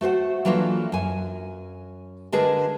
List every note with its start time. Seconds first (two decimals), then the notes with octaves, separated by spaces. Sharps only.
0.01 A3 F#4 C5 F#5
0.45 E3 F#3 A#3 D4 F4 A4
0.92 F#2 G#5
2.32 D3 G#3 D4 G#4 A#4 B4